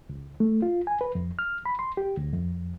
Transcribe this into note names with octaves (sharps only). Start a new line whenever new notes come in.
C#2
A3
F4
G#5
B4
F2
F6
B5
C6
G4
D2
F2